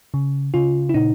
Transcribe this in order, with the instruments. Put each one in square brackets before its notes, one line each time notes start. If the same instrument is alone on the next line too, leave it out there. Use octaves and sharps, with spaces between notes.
[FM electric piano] C#3
C#3 F4
E4
A#2 D#4